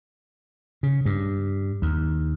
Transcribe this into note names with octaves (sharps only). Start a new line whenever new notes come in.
C#3
G2
D#2